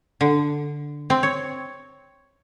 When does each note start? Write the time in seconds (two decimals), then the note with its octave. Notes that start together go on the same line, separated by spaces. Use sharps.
0.21 D3
1.10 C4
1.23 C#5